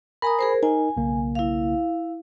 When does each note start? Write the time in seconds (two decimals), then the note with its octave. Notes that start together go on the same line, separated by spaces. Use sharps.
0.22 A#4 G#5 A#5 B5 D#6
0.39 G#4 A#4 C5
0.63 D#4 A#4 G#5
0.97 B1 C#3 A#3
1.35 E4 F5